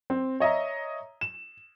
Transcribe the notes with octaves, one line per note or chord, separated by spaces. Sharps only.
C4
C#5 D#5 E5 A#5
E7